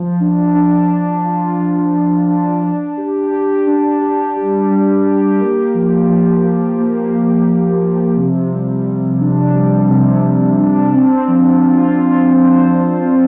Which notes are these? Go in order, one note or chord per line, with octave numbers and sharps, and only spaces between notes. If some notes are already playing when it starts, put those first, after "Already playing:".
Already playing: F3
D4
D4
D4
F4
F3
F3
D4
D4
G4
G4
D4
G4
G3
G3
G4
A#3
F3
F3
F3
A#3
A#3
F3
F3
C3
G3
C3
D4
G3
C3
C3
D4
C4
F3
F4
F4
C5
F3
F4